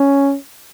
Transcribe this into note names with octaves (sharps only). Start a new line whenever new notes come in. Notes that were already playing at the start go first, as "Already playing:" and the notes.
Already playing: C#4